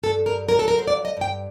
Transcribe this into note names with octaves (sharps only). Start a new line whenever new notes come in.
G2 A4
G2 A#4
F#3 A#4
A4
F#3 A#4
C5
D5
G2
D#5
G2 G5